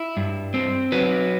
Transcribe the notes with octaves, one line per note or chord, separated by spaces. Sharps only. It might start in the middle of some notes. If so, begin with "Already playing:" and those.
Already playing: E4
G2
C4
F#3 B4